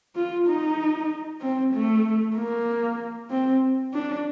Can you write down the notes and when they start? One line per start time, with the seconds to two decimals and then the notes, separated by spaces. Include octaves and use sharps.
0.15 F4
0.48 D#4
1.41 C4
1.73 A3
2.36 A#3
3.30 C4
3.94 D4